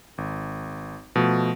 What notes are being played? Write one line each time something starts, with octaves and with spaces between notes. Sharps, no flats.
G#1
B2 F3 A3